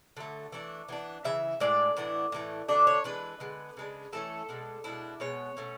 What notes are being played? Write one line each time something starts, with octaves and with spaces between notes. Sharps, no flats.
D3 F#3 A3
E3 A3 D4
E3 B3 D4
C#3 E3 E5
A2 G#3 D4 D5
A2 E3 B3 D4
A2 E3 A3
D3 F#3 A3 D4 D5
C#5
E3 G#3 D4 B4
D3 G#3 B3
C#3 G#3 D4
E3 A3 C#4 A4
B2 G#3 D4
B2 G#3 D4 E4
B2 G#3 B3 C#5
B2 A3 C#4